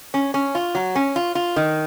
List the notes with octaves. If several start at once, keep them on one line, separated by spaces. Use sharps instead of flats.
C#4
C#4
F4
F#3
C#4
F4
F4
D#3